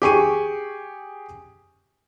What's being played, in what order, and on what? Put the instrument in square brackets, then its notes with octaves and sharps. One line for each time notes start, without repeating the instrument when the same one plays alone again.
[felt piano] G4 G#4 C#6 D#7